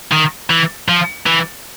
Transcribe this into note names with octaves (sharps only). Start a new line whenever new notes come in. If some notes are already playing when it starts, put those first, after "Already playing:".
D#3
E3
F3
E3